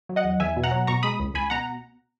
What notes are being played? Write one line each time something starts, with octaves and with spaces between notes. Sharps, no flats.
F#3
D#5 F#5
E2
E2 E5 G#5
B2
F#5 A#5
F#3
B2 A#5 C#6
G#3 B5 D#6
C#2
C#2 G#5 B5
B2 F#5 A#5